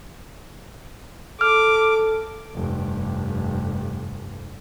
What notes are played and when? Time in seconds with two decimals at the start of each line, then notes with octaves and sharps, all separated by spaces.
1.41 A4 D6 F6
2.54 F1 G2